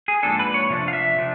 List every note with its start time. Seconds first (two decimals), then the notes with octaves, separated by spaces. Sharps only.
0.08 G#4
0.23 G#2 F3 A#3 D4 A4
0.39 B4
0.54 C#5
0.70 C3 F3 A3 D4
0.88 F5
0.93 E5
1.16 C3 F3 A3 D4